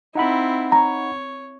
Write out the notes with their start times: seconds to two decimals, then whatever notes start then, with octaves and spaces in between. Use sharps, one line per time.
0.15 C4 D#4 E4 F#5 B5
0.72 C#5 A#5